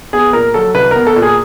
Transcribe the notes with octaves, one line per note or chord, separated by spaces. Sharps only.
B3 G#4
A#2 A#4
F#3 A4
C2 B4
B3 A#4
A4
A#2
G#4